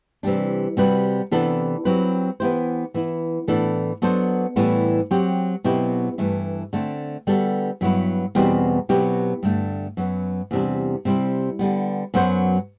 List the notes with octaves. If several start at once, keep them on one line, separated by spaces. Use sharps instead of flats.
C3 E3 G3 D4
C3 G3 C4 F#4 B4
C3 E3 B3 D4 A4
F#3 C4 E4 G4 B4
E3 B3 E4 G4 C5
E3 B3 E4
A2 E3 B3 D4 A4
F#3 B3 D4 A4 C5
A2 E3 G3 B3
F#3 C4 G4
B2 F#3 C4 E4 G4
G2 E3 A3
D3 A3 C4
D3 G3 B3 F#4 A4
G2 F#3 B3 E4 B4
E2 B2 G3 C4 F#4
B2 F#3 C4 E4 G4
G2 D3 A3
F#2 F#3 B3
E2 C3 G3 D4
C3 G3 C4 E4
D3 G3 B3
F#2 F#3 B3 F#4 C5